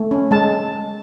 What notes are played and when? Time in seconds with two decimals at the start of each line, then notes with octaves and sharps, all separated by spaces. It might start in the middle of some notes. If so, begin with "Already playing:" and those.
Already playing: A3
0.11 C#4
0.31 G#3 A5